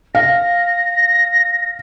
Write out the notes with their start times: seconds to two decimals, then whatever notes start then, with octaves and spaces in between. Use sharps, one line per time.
0.15 F5 A#6